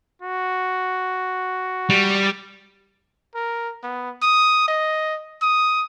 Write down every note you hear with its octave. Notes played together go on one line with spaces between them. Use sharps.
F#4
G3
A#4
B3
D#6
D#5
D#6